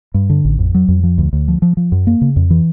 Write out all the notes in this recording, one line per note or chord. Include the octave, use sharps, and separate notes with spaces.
G2
D3
A1
F2
F#3
F2
F3
D2
D2
F3
F3
F3
F#2
A#3
C#3
F2
E3